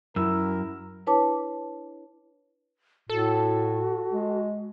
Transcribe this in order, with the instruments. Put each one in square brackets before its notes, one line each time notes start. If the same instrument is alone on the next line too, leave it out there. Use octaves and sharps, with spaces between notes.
[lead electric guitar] F#2 [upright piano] E4 E6 [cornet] A#4
[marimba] D4 E4 B4 C#5 A5 D6
[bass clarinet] A2 [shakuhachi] F#4 [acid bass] A4
[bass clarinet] G#3